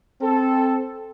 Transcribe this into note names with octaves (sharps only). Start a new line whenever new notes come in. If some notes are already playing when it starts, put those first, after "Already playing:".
C4 A4